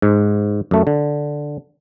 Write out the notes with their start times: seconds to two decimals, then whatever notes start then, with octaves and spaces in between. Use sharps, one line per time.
0.02 G#2
0.71 F#2 A3
0.87 D3